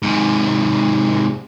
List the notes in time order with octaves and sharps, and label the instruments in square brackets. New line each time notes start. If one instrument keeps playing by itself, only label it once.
[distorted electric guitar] G#2 C3